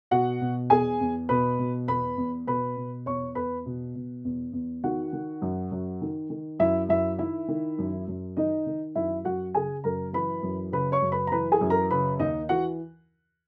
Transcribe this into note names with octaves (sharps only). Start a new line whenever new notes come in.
B2 F#4 F#5
B2
E2 G#4 G#5
E2
B2 B4 B5
B2
E2 B4 B5
E2
B2 B4 B5
B2
E2 C#5 C#6
E2 B4 B5
B2
B2
E2
E2
D#3 F#4 F#5
D#3
F#2
F#2
D#3
D#3
F#2 E4 E5
F#2 E4 E5
D#3 E4 E5
D#3
F#2
F#2
D#3 D#4 D#5
D#3
F#2 E4 E5
F#2 F#4 F#5
C#3 G#4 G#5
F#2 A#4 A#5
E3 B4 B5
F#2
C#3 B4 B5
C#5 C#6
F#2
B4 B5
A#5
E3 B4 B5
G#4 G#5
F#2
A#4 A#5
C#3 B4 B5
D#2 D#4 D#5
E3 F#4 F#5